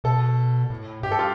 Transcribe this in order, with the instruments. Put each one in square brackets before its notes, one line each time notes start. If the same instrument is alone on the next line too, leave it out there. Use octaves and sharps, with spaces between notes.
[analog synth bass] B2 [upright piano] A4
[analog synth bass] A2
[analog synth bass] G2 [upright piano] G4
[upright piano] A4
F4